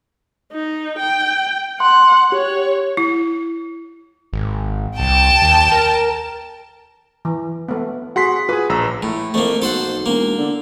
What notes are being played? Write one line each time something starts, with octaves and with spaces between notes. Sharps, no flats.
D#4
G5
F#5 C6
G4 C#5
E4
G#1
C2 G5 A5
D#2
A#4
E3
A3 B3
F#4 G#4 F#5 C6 B6
F4 G#4 B4
A#1 A#5 E6
A2
F2 A3 A#3
B1 A4 C5 F#5
E1 A#3
D3